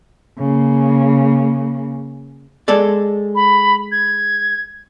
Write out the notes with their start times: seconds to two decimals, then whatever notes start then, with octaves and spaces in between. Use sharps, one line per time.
0.39 C#3 A#3
2.68 G#3 A4 D5
3.35 B5
3.92 G#6